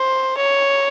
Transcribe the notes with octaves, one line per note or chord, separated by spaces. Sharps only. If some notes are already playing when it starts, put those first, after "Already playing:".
Already playing: C5
C#5